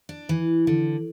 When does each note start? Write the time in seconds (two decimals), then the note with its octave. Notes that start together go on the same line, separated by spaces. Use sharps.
0.09 D4
0.29 E3
0.67 D3